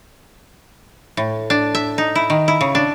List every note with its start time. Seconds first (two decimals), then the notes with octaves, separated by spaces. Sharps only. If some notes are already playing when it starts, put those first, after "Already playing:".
1.17 A2
1.50 D4
1.75 E5
1.98 D#4
2.15 E4
2.30 D#3
2.48 E4
2.61 C#3
2.75 D4